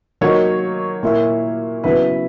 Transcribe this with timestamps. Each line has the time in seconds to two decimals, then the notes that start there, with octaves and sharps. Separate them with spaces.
0.21 F#3 A#3 D#4 C#5
1.03 A#2 A#3 E4
1.84 C#3 F#3 B3 E4 B4